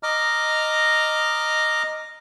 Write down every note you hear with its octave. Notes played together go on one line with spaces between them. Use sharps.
D#5 A#5 D6 F6